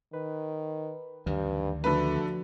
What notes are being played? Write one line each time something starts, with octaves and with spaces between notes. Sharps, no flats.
D#3 B4
D2 G2 D#3 E3
D3 F3 A3 D4 F#4 B4